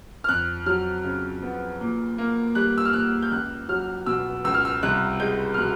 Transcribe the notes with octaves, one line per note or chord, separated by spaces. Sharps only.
F6
F2 F#6
F#3 F6
C#3
B3
A#2
A#3
G3 F#6
E6
F6
A#2 F#6
G6
C#2 F#6
F#3 F6
B2 E6
C#2 E6
F6
E6
C2 F#6
G#3 G6
F6
B2 F#6